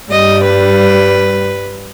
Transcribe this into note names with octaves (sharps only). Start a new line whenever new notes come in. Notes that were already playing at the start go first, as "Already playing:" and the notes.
G2 G3 D#5
B4